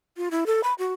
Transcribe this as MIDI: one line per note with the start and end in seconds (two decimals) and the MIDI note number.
0.17 0.29 65
0.31 0.44 64
0.46 0.61 69
0.64 0.74 83
0.79 0.93 66